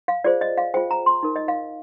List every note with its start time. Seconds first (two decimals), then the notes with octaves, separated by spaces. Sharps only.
0.08 F5
0.24 F4 G#4 C5 D5
0.41 D#5
0.58 F5
0.74 F4 G#4 C5 G5
0.91 A#5
1.06 C6
1.23 D#4 A#4
1.36 D#5
1.48 F5